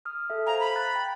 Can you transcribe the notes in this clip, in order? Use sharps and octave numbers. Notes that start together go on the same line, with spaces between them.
D#6 F6
A4 E5
C5 F5 G#5 A#5
B5
A#5 F#6 A6
G5